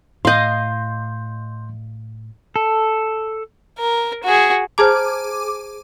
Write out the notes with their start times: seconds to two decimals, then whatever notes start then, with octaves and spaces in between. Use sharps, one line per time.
0.25 A2 D#5 F5 C6 G6
2.56 A4
3.79 A#4
4.24 F#4 G#4
4.78 G#4 C5 A5 A#5 D6 F6